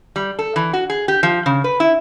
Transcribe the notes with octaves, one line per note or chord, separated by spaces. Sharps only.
G3
A4
E3
F#4
G#4
G4
F3
C#3
B4
E4